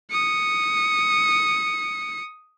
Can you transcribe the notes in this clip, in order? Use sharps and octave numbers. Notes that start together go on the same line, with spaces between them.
D#6 C#7